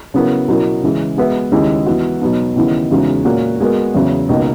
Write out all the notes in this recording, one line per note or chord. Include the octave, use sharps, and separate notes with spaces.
C#3 F#3 B3 E4 A#4
B2 F#3 C#4 E4 A#4
C#3 E3 G#3
G#3 B3 F#4 B4 E5
D#2 C#3 G#3 C#4 E4
E3 B3 F#4
B2 F#3 B3 D#4
D#2 C#3 E3 B3 E4
E2 C#3 G#3 D#4 F#4
A#2 A#3 C#4 F#4
G#3 B3 F#4 A#4
E2 C#3 F#3
C#2 B2 A#3 D#4